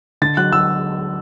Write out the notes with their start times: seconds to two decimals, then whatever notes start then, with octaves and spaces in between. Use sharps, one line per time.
0.22 D3 A6
0.37 F#3 F#6
0.52 F#3 E6